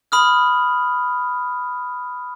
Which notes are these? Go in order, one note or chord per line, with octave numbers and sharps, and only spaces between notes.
B5 D#6 F6